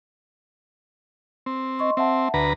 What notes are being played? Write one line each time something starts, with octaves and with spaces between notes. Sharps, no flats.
C4
D#5 C6 C#6
C4 E5 F#5 A5
D2 B4 A#5